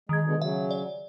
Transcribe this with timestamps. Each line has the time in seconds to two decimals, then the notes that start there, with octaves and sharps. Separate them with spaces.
0.09 D#3 G#3 G#6
0.24 B2 D3 G#3
0.42 C#3 F#3 E5
0.71 D5